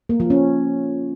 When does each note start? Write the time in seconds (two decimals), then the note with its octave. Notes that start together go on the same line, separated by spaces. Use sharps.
0.09 A#3
0.20 F3
0.30 C#4